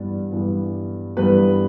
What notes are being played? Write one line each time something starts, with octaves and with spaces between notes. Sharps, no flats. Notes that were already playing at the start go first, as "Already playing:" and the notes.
Already playing: G2 E3 G3 B3 D5
G2 E3 G3 B3
G2 E3 G3 B3 B4